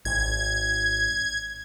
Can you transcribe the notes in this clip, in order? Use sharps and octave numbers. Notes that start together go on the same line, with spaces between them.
G#1 G#6